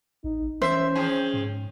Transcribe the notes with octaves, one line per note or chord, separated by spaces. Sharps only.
A1 D#4
E3 C#4 C5 E5
F3 C4 G#4
G#2